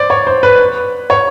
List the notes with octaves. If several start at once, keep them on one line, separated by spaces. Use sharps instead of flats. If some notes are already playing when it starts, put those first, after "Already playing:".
Already playing: C5 D5
C#5
C5
B4
C#5